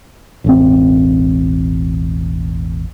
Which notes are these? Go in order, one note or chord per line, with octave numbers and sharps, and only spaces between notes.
E1 A1 C4